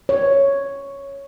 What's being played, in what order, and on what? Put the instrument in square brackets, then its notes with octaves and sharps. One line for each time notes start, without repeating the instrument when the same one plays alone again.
[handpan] C#5